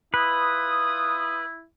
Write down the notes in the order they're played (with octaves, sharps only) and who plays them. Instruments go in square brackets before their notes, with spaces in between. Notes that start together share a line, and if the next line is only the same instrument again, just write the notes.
[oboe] E4 [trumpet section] F4 D#6 [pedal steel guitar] B4